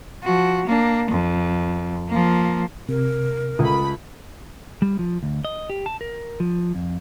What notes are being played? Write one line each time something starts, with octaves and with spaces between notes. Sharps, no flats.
F3 F#4
A#3 D4
F2
F3 A#3
C3 A#4
C#2 A3 B5 D#6
G3
F3
D2
D#5
G4
A5
A#4
F3
F2